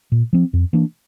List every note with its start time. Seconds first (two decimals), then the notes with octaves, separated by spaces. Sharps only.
0.12 A#2
0.33 F3 C4
0.53 F2
0.73 E3 A#3 D4